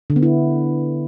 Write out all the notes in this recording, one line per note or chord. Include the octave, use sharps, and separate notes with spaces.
D3
B3
E4